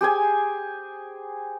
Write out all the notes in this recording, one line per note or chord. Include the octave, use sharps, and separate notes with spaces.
G4 G#4 C5 G#5